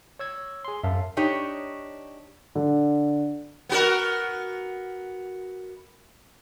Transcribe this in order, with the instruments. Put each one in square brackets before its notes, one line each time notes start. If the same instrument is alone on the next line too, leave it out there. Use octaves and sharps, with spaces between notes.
[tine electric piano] C#5 E6 G#6
G#4 C6
[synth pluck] F#2 [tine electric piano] E5 F5 A5
[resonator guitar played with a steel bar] D4 D#4 G4 C#5
[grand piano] D3
[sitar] B3 F#4 A#4